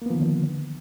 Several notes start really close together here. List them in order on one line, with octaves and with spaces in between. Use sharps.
A#3 B3 F3 D#3 D3